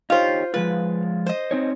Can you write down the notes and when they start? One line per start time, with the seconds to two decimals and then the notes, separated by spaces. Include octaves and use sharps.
0.10 D#4 F4 G4 C5 C#5
0.54 F3 G#3 F4 B4
1.26 C5 D#5
1.51 C4 D#4 C#5